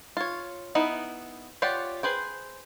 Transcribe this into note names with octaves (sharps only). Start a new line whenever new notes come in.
F4 C#5
B3 D#4 E4
F4 G4 C#5 D5 F#5
G#4 B4 C5 G5